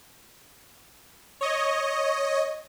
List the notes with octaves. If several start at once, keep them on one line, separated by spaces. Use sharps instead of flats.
C#5 D#5